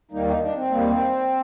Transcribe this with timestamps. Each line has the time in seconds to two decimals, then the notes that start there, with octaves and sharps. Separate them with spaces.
0.11 D#2 D#3 G3 A#3 D#4
0.26 D#4
0.41 D4
0.55 C4
0.71 D#2 D#3 G3 A#3